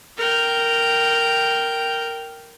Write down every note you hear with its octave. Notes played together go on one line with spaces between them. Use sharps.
A#4 G5